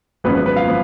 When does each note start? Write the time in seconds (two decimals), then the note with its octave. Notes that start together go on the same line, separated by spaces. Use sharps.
0.24 G#1 F#2 F3 B3 B4
0.35 B4
0.46 B4
0.56 F4 F5
0.68 F3 B3